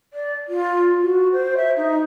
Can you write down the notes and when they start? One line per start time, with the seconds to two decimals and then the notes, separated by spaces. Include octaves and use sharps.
0.13 D5
0.48 F4
1.02 F#4
1.32 C5
1.56 E5
1.77 D#4